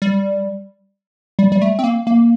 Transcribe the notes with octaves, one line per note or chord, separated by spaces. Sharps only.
G3
G3
G3
A3
C4
A#3
A#3